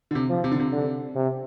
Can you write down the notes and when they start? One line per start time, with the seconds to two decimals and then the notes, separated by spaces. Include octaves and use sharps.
0.11 D3
0.15 C3
0.29 F3
0.44 C3
0.51 D3
0.60 C3
0.72 D3
1.15 C3